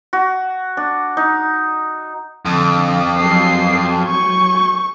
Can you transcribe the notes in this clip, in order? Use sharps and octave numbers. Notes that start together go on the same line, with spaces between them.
F#4
D4
D#4
F2 D3
F#3 G#5 G6 C7
C#6